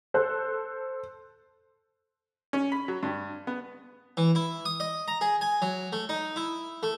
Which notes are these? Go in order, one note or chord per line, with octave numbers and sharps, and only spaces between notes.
A4 C5 F#6
C#4
B5
F#3
G2
B3
E3
E4
D#6
D#5
A#5
G#4
G#5
F#3
A3
D#4
E4
A3